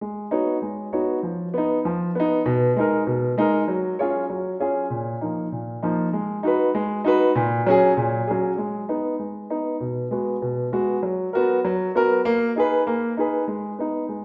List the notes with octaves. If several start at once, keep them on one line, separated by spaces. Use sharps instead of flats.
G#3
B3 D#4 F#4 C#5
G#3
B3 D#4 F#4 C#5
F3
B3 D#4
F3
B3 D#4
B2
G#3 D#4 A#4
B2
G#3 D#4 A#4
F#3
C#4 F4 G#4 C#5
F#3
C#4 F4 G#4 C#5
A#2
F3 A#3 D#4
A#2
F3 A#3 D#4
G#3
D#4 F#4 B4
G#3
D#4 F#4 B4
A#2
F#3 C#4 G#4
A#2
F#3 C#4 G#4
G#3
B3 D#4
G#3
B3 D#4
B2
G#3 B3 F#4
B2
G#3 B3 F#4
F#3
B3 F#4 A#4
F#3
B3 F#4 A#4
A#3
D#4 G#4 B4
A#3
D#4 G#4 B4
G#3
B3 D#4
G#3